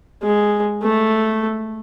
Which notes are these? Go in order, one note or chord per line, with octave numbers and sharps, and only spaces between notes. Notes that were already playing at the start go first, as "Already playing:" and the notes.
G#3
A3